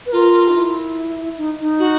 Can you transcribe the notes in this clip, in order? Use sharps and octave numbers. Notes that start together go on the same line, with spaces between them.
B4
F4 A#4
D#4
E4
D#4
D#4
F#4